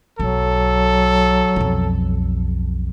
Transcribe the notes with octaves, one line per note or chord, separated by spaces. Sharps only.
B1 F#3 A4
B1 F2